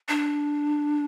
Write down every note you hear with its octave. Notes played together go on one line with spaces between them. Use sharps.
D4